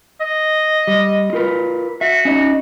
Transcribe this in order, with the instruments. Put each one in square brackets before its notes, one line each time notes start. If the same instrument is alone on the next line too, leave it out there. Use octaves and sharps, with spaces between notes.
[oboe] D#5
[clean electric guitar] G3
F4 A#4 B4
[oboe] F#4 [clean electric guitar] E5
[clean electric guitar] C#4 D#4 D#5